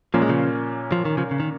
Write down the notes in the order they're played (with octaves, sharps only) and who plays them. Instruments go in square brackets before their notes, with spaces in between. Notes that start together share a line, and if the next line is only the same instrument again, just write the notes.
[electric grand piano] A#2 A#3 C#4 [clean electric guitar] F3
[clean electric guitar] G#3
C#3 F3
F3
D#3
C#3 F3
C#3
D#3